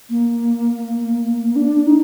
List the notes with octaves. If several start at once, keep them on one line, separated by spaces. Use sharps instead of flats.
A#3
D4
D#4